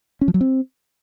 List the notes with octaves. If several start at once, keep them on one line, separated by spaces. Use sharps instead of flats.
C#4
F3
F#3
C4